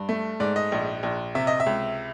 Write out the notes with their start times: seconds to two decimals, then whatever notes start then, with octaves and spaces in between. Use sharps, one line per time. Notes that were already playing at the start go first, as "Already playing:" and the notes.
Already playing: G2
0.09 A3
0.40 G#2 D5
0.56 D#5
0.72 A#1
1.03 A#1
1.35 C3 E5
1.47 D#5
1.60 E5
1.66 C#2